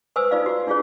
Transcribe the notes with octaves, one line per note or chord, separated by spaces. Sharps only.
B4 C5 G#5 D#6 E6
D#4 F4 D5 F5
F4 F#4
D4 E4 F4 G#4 C#5